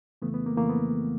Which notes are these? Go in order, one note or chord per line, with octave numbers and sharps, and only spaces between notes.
F2 C#3 E3 A3 B3
B3
A#3
F2 C#3 E3 A3 A#3
B3